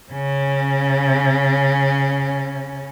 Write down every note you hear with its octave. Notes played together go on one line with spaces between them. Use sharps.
C#3 C#4